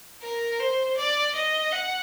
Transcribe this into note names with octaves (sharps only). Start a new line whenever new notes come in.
A#4
C5
D5
D#5
F#5